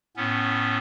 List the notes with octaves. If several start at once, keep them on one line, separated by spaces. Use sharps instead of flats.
A2 B3 C#4